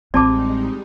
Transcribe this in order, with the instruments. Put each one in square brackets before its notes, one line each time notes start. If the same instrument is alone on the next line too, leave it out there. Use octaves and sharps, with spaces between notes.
[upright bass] A1 [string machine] G3 G#3 D#4 [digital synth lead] C4 [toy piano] D5 A5 D6